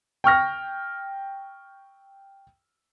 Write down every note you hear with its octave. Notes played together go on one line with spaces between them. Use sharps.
G5 C#6 F6 A#6